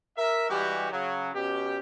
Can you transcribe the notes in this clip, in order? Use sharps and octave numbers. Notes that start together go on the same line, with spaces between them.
A#4 E5
E3 G3 G#3 F#4 G4
C#3 F#3
B2 C#4 G4